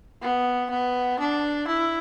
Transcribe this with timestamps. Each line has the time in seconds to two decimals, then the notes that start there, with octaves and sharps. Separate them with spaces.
0.22 B3
0.70 B3
1.19 D4
1.67 E4